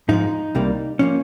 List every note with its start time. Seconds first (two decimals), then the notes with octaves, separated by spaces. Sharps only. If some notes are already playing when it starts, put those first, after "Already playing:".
0.09 G#2 F3 G#3 D#4
0.55 C2 C3 G3 A#3
0.99 F3 A#3 C#4